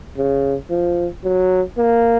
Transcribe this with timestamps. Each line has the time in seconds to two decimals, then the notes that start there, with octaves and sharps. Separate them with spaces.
0.17 C#3
0.70 F3
1.24 F#3
1.78 A#3